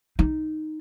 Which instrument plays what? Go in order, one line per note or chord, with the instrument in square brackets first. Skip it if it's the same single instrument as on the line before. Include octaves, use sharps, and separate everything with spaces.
[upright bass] D#4